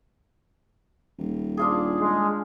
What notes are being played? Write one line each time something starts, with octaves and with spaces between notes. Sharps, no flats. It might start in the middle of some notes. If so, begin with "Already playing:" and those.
D#1
D4 F4 G#4
G#3